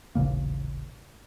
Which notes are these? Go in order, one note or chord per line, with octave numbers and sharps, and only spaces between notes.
D#1 A1 C#3 A#3